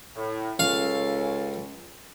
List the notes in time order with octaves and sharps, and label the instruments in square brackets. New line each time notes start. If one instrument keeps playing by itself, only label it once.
[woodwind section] A2
[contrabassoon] C#2 [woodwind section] C#4 A4 [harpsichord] F5